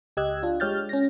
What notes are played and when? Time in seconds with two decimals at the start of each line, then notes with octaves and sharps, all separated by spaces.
0.17 C#2 G4 D#5 E6 F#6 G#6
0.43 D4 F4
0.60 G#3 G4 C#5 F6 G6 A6
0.89 C#4 A#6